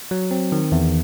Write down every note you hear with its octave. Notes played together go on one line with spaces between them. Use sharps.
F#3
C4
D#3
E2